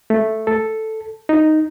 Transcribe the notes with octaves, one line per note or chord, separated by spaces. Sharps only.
A3
A4
D#4